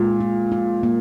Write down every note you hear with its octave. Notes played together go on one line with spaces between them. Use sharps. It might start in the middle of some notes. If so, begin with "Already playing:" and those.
Already playing: A#2 G#3
F4
F4
A#3